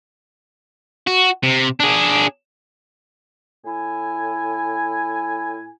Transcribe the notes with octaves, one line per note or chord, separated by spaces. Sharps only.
F#4
C3
D4 G#4
A2 E4 G#5